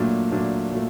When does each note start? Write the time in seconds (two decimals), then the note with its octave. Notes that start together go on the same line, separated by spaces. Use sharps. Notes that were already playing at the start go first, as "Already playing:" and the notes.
Already playing: A#2 F#3 A3 D4
0.32 A#2 F#3 A3 D4
0.71 A#2 F#3 A3